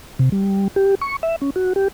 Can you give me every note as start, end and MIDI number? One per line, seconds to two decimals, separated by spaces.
0.19 0.29 48
0.32 0.68 55
0.76 0.95 67
1.01 1.16 85
1.23 1.36 76
1.42 1.50 61
1.56 1.73 66
1.76 1.88 67